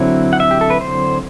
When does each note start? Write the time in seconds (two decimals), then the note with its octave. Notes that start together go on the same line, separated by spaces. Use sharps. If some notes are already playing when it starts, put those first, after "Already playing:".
Already playing: D3 F#3 C4 E4 F#5
0.33 F#5
0.40 E5
0.51 G4
0.61 A4
0.70 B4
0.81 C5